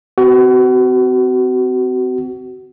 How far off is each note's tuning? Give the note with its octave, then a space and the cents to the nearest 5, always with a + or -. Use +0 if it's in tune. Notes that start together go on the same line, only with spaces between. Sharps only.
C4 -30 F#4 +30